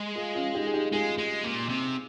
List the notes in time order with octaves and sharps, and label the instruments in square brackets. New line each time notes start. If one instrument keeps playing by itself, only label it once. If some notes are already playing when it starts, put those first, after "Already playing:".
Already playing: [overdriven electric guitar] G#3
[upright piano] F4 G#4
C#4 F4
D#4 G4
G#4
D#4 G4
[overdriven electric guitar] G#3 [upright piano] F4 G#4
[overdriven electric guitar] G#3
A#2
C3